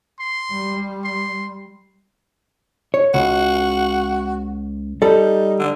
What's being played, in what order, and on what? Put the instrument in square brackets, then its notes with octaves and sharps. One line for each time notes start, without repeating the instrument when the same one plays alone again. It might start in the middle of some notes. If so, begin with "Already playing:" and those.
[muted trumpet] C6
[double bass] G3
[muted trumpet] C6
[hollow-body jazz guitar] C#5
[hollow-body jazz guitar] C#2 [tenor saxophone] F#4
[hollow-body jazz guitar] G3 A4 [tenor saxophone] D#4
[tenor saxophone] D3